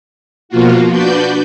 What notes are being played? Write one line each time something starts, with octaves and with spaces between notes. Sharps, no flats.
B2 F3 A#3 F4 F#4
D4 F#4 B4 D5 G6